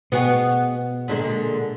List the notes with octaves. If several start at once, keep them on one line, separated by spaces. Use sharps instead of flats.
B2 B3 F#4 G#4
A#2 D3 G#3